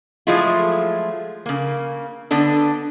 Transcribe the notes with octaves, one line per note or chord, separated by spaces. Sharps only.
F3 F#3 G#3 A3 E4 F4
C#3 A#3
D3 B3 D4 A4